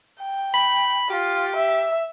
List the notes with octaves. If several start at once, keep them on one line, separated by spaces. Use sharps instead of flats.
G5
B5
F4 G4
E5